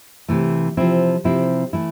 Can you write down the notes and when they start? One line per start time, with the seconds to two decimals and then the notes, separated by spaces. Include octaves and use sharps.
0.29 C3 E3 A3
0.77 C3 F3 C4 E4
1.24 C3 F3 C4 E4
1.73 E3 A3 E4